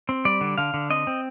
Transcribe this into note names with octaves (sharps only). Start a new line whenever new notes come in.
C4
G3 D5
D3
D3 F5
D3
C4 D#5
C4